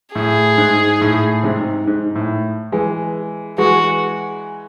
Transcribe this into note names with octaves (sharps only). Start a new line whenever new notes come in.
A2 G#4
G#2
A2
G#2 C3
G#2
A2
E3 G#3
E3 G#3 F#4